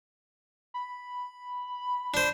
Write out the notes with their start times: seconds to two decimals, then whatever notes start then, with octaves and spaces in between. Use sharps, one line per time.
0.74 B5
2.14 D4 C5